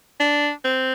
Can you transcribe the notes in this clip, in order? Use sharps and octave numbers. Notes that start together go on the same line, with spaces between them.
D4
C4